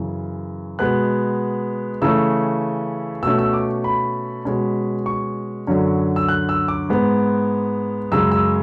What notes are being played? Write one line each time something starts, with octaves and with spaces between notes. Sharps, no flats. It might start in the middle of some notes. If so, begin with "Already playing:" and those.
Already playing: F#2 C#3 E3
B2 G#3 B3 F#6
C#3 E3 A3 C#4 E6
B2 A3 C#4 E6
E6
D6
B5
B2 G#3 C#4
C#6
F#2 D3 F#3 C#4
E6
F#6
E6
D6
G#2 G#3 B3
F#2 C#3 G#3 E6
E6